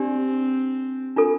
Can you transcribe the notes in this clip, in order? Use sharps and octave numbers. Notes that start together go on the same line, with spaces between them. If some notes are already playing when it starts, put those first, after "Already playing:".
Already playing: C4 D4 G4 D5
D4 F4 A4